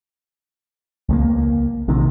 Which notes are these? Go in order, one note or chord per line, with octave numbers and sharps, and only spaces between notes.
C#2 G#3 A#3
A#1 C3 D#3